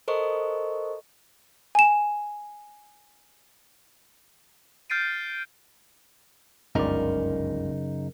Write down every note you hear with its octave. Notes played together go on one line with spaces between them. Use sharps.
A4 A#4 C5 D#5 C#6
G#5 E7
F6 G6 A6 C7 D7 D#7
G1 C#2 F#2 C#3 D#4 A#4 D5